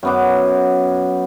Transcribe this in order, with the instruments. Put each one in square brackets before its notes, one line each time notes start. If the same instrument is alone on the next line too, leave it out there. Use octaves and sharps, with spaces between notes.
[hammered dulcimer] F#2 B3 D6